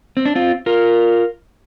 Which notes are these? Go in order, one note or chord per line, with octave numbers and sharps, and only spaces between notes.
C4
D4
C4 F4
F4 A#4